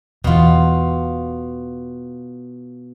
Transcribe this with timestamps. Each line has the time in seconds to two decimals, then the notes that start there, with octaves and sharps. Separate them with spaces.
0.24 E1 B2 E3 F4